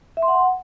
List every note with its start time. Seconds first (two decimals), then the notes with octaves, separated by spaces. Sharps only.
0.17 E5
0.22 C6
0.28 F#5